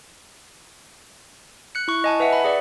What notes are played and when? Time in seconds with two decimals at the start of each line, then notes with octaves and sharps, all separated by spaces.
1.75 F#6 C#7
1.88 E4 C#6
2.04 D#5 G#5 A5
2.20 B4 E5 F#5
2.33 B5
2.44 G#4 D5